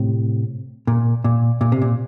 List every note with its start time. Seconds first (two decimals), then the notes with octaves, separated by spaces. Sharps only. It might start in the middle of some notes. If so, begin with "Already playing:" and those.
Already playing: A2 C3
0.87 A#2
1.24 A#2
1.61 A#2
1.72 C3
1.82 A#2